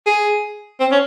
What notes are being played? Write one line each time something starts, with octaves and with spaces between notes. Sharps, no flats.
G#4
C4
C#4